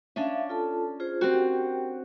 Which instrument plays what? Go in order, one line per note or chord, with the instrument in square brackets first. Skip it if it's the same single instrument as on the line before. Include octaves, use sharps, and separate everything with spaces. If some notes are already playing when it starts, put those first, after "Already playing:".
[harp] C#4 D4 [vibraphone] E5 F5
[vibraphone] F4 A4 A5
F4 G#4 C5
[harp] C4 F#4 [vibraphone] G4 A#4 G5